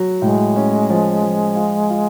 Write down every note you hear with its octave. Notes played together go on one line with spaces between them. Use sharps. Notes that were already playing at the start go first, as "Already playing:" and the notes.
Already playing: F#3
A2 G#3
C#4
F3
F3
F4
F4